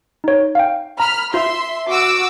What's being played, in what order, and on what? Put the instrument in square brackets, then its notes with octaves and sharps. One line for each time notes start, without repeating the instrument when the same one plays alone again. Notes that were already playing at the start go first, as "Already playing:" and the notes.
[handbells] D#4 C#5
F5 G5
[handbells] A#5 [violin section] B5 F6
[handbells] F4 [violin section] E5 C6
[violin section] F#4 D6 E6